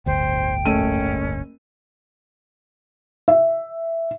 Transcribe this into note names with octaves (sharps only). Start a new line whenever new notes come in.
D1 G1 D2 C5 G5
F#1 A3 C#4 D#7
E5